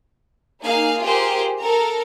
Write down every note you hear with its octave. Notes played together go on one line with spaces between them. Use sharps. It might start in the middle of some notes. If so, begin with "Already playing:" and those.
A#3 D#4 G#4 F5
F4 G4 G#4 A#4 C5
A4 A#4 A#5